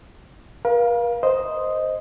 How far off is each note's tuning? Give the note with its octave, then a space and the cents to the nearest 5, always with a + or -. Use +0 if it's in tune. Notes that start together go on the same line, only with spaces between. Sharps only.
A#4 +45 F5 +0
C5 +0 D#5 +0